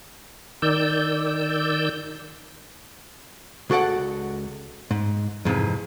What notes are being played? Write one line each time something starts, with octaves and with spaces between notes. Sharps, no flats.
D#3 D5 E6 G6
C#2 F#4 A4 D5 F#5
G#2
F2 G#2 C3 E3